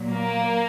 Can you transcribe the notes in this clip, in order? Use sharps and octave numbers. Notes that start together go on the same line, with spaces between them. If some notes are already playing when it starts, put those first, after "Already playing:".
Already playing: A#2 F#3
A#3